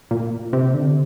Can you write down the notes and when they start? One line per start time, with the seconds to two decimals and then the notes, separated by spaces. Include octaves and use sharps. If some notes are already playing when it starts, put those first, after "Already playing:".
0.11 A#2
0.53 C3
0.74 D3